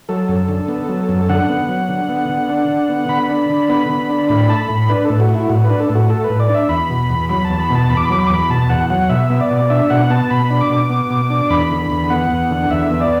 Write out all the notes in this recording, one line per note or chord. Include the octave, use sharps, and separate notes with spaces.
F#3 A4
F#2
D3
B3
F#3
F#2
D3 F#5
B3
F#3
D3
B3
D3
D4
D3
B3
D3 B5
D4
D3
B3 B5
D3
D4
A2 B5
A3 A5
B5
A2
D4 B4
A2 A4
F#4
A3
E4
A2 F#4
B4
D4
A4
A2
F#4
A3 A4
B4
A2
D5
D4
E5
E2 B5
B2
E2
F#3 B5
A5
E2
B5
B2 A5
E2 B5
D6
B5
F#3 D6
B5
D6
E2 B5
B2 A5
E2 F#5
F#3 F#5
B2 E5
B3
D5
B2
D4 E5
B2 F#5
B3 A5
B2 B5
D4
D6
B2
B3
B2
D4
E2 B5
D3
E2
B3 F#5
E2
D3
E2 E5
B3
D5